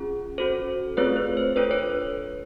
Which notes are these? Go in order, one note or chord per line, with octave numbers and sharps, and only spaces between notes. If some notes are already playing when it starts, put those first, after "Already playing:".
Already playing: C#4 F4 G#4
C#4 F#4 A4 C5
A3 C4 F4 G#4 B4 C#5
B4
C5
D4 F4 A4 B4 C#5
B4 C#5